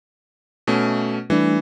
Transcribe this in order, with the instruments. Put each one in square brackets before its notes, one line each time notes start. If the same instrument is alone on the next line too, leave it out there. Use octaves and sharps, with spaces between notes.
[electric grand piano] B2 A3 C#4
[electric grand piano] E3 [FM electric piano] G3 A3 D4